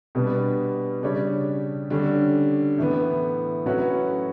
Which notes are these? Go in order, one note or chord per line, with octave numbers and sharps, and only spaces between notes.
B2 G3 B3 D4
C#3 G3 D4 G4 C#5
D3 G3 C#4
A2 E3 B3
A2 F#3 C#4 F#4 B4